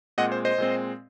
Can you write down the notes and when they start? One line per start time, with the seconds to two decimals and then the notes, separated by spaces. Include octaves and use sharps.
0.18 A#2 G#3 C4 D#5 F#5
0.32 C5
0.45 C5 D#5
0.58 A#2 G#3 C4